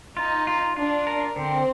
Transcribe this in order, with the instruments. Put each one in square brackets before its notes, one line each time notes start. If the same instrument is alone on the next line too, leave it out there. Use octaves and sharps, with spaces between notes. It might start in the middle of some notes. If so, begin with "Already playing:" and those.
[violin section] D#4 [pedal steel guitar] F4
[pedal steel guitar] F4
[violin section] D4 [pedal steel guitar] F4
[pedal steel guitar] A#4
[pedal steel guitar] D3 [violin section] C4